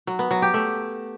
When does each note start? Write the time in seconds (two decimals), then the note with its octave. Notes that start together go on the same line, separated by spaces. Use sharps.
0.07 F#3
0.19 B3
0.31 F#3
0.42 G4
0.54 A3